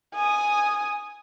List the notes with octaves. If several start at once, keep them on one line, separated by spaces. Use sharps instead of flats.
G#5 D#6